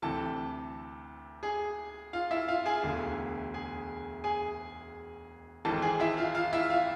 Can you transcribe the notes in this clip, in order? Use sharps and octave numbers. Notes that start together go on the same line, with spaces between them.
D2 C3 E3 A4 A5
G#4 G#5
F4 F5
E4 E5
F4 F5
G#4 G#5
E1 D2 D3
G#4 G#5
G#4 G#5
G#1 G#2 E3 A4 A5
G#4 G#5
E4 E5
F4 F5
F4 F5
E4 E5
F4 F5